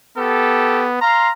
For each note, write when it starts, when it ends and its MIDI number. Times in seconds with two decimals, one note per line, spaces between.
0.17 0.99 59
0.17 0.89 67
0.17 0.89 69
1.02 1.30 77
1.02 1.32 82
1.02 1.30 84